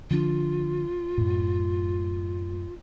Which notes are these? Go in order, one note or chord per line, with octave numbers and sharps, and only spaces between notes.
D3 F3 D4 F4
F#2 A2